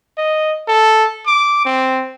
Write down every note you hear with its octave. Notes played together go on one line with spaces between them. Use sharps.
D#5
A4
D6
C4